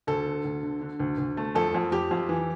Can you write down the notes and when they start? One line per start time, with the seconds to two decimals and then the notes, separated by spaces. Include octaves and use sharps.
0.07 D2 A4
0.26 D3
0.44 D2
0.63 D3
0.81 D3
1.00 D2
1.18 D2
1.37 A3
1.55 F2 A4
1.74 F2
1.92 F2 G4
2.11 F2
2.29 E3